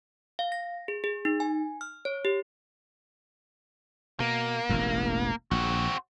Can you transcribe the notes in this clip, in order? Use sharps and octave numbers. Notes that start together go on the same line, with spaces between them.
F5
A#6
G#4
G#4
D#4
G#5
F6
C#5
G4
B2 A#3
E1 A1 E2
A#1 C4 F#4